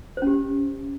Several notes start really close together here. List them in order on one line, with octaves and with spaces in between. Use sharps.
C5 C#4 G4